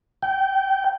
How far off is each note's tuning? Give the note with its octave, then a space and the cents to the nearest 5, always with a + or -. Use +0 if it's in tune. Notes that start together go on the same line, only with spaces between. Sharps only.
G5 -25